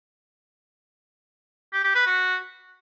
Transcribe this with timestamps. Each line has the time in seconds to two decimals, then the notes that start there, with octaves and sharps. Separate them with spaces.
1.73 G4
1.84 G4
1.95 B4
2.06 F#4